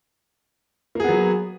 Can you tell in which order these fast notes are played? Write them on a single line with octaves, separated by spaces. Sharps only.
A#3 G#4 B3 F#3